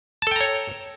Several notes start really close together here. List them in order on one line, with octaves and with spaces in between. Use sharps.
A5 A4 G5 A#5 C#5